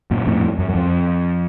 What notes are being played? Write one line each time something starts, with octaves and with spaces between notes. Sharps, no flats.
F#2 A#2
F2 A2
F#2
F#2
F2